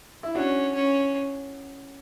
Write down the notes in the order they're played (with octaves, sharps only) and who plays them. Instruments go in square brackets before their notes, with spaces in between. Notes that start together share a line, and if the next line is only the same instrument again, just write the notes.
[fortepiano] E4
[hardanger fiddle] C#4 [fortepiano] D4 F#4
[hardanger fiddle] C#4